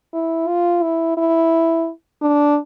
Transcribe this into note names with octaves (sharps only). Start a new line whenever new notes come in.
E4
F4
E4
E4
D4